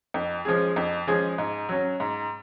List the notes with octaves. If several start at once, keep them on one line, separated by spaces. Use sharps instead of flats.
F2
F3 G#3 C#4 G#4
F2
F3 G#3 C#4 G#4
G#2
F#3 C#4
G#2